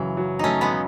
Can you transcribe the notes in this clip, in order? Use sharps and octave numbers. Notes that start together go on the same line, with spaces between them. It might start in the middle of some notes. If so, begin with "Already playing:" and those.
Already playing: F#1 C#3 E3 F#3
F#3
F#3 A3 C#4 D#4
G#3 B3
C#3